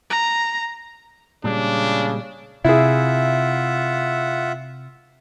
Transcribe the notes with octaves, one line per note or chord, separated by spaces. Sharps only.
A#5
A#2 C#3 G3 G#3 D4
C3 E4 F4 G#4 E5 F#5